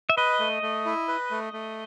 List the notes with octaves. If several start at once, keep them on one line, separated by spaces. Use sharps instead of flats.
E5
B4 D#5
A3
A3
E4
B4
A3
A3